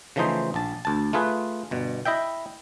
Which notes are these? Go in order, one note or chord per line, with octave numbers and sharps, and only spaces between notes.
C#3 E3 F3 A3 D#4 C5
A#1 A5
D2 A5
A3 F4 G#4 B4
G1 B2
E4 D#5 E5 G5